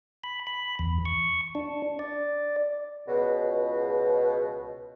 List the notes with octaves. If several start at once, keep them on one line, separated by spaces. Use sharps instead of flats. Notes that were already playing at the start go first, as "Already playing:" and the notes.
B5
B5
E2
C#6
D4
D5
C#2 B2